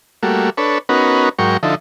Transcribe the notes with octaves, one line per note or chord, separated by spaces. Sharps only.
G3 A3 A#3 F#4
D4 A4 B4 C#5
B3 C#4 D#4 F#4 A#4 B4
G#2 F#3 A#4 G5 C#6
D3 F3 D#4 E4 A4